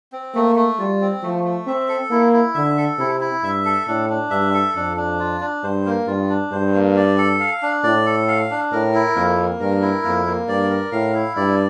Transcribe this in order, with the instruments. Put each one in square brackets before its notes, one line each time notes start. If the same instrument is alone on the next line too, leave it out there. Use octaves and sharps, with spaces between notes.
[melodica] C4
[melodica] A3 [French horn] A#3
[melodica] A3
[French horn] G3 [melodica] F4
[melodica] C4
[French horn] F3 [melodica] A3
[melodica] A3
[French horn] C4 [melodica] E5
[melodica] A4
[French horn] A#3 [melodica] E4
[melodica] E4
[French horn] D3 [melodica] E5
[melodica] A4
[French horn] C3 [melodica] E4
[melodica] E4
[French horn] G2 [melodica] E5
[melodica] A4
[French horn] A2 [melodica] D4
[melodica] D4
[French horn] G2 [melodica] E5
[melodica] A4
[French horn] F2 [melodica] D4
[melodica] D4
F4
D4
[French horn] G2 [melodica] C5
[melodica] A#3
[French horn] G2 [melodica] F4
[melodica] D4
[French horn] G2 [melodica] C5
[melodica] A#3
D5
A4
F5
D4
[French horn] A2 [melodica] D5
[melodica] A4
F5
D4
[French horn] A2 [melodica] A#4
[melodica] E4
[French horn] F2 [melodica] A#3
[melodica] A#3
[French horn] G2 [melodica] A#4
[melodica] E4
[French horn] F2 [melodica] A#3
[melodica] A#3
[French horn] G2 [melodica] D5
[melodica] A#4
[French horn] A2 [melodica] F5
[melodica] E4
[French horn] G2 [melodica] D5